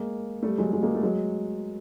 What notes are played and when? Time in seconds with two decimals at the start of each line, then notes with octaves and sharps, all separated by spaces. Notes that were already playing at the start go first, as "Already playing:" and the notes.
Already playing: G#3 A#3
0.43 G3 A3
0.58 F#3 G#3
0.73 F#3 G#3
0.83 G#3 A#3
0.95 A3
1.03 F#3 G#3